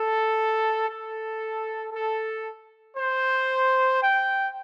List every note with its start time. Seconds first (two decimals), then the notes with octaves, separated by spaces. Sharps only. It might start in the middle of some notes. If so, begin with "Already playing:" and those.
Already playing: A4
0.88 A4
1.92 A4
2.96 C5
4.01 G5